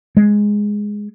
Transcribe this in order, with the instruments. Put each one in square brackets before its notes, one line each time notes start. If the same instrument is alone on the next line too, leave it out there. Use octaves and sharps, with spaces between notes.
[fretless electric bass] G#3